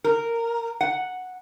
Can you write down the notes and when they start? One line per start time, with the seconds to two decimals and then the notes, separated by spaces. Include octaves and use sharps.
0.04 A#4
0.81 F#5